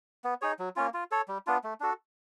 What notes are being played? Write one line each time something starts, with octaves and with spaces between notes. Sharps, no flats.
B3
D#4 G#4 C#5
F#3
A#3 C#4 F4
F4
A4 C#5
G3
B3 D4 F4
A3
D4 F#4 A4